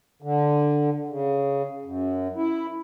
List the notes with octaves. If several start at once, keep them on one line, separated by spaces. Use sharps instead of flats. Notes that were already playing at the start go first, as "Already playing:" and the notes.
D3
C#3
F#2
E4